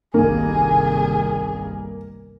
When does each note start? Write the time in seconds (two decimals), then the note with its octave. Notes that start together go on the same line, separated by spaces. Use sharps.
0.14 G1 C2 D#3 A#3 G#4